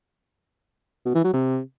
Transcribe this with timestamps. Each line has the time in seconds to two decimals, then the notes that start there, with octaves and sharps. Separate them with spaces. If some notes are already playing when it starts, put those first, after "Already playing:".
1.05 B2
1.15 E3
1.24 F#3
1.33 C3